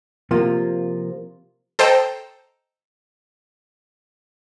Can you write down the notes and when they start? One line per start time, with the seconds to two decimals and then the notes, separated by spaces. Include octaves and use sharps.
0.31 C3 F3 A#3 F4
1.79 A4 C5 D#5 G5 A5 A#5